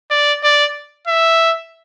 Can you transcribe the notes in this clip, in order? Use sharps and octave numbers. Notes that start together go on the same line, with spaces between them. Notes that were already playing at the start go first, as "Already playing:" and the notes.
D5
D5
E5